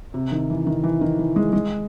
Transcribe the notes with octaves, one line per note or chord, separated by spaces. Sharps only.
C3
D#3
E3
D#3
E3
D#3
E3
G#3
G#3